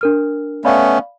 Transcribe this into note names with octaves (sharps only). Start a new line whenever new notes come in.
D4 A#4 F6
A3 B3 C#4 D5 F5 B5